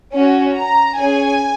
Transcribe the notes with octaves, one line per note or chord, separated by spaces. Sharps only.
C#4 F#4
A#5
C#4 G#4 G#5